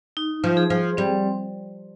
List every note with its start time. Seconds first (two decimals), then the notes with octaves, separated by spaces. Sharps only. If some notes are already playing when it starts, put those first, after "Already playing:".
0.17 D#4
0.44 F3
0.57 G#4
0.70 F3
0.97 G3 C4